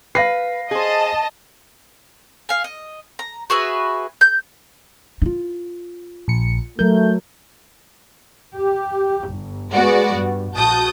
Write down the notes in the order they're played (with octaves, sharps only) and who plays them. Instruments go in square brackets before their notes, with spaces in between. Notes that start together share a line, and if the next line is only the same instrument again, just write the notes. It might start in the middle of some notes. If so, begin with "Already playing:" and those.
[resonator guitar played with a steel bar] B4 [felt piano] F5 A#6 C7
[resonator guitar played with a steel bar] G#4 C5 [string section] D#5 A5
[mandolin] F5 G#5
D#5
A#5
F#4 G#4 B4 E5
G6
[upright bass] D#4 F4
[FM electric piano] A#1 C#7
[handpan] F#3 A#4 [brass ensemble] A3 [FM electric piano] G6
[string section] G4
G1
G#3 B3 F#4 D5
G2
A#1 F#4 A5 D#6 G6